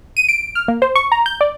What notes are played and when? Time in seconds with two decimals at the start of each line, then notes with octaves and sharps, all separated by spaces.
0.17 D#7
0.29 D7
0.55 F6
0.68 A#3
0.82 C5
0.96 C#6
1.12 A#5
1.26 G6
1.41 D5